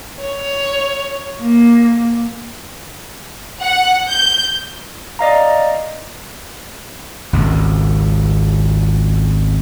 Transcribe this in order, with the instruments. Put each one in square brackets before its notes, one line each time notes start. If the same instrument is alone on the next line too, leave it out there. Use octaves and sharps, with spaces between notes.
[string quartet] C#5
A#3
[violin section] F#5
G6
[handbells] D5 D#5 F5 A#5
[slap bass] G#1 C#2